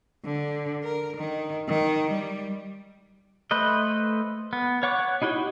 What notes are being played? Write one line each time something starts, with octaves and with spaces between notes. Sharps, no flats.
D3
A#4
D#3
D#3
G3
A3 B4 C5 D#5
B3
C#5 F#5 C#6 D6
D#4 E4 F#4 G4 C#5